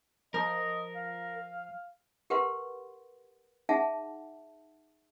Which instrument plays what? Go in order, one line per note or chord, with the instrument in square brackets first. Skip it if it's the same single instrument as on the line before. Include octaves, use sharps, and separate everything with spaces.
[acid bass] F3 [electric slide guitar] A#4 [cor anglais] D#5
[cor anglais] F5
[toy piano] G4 A#4 B4 F#5 C6
D#4 G#4 E5 F#5 A5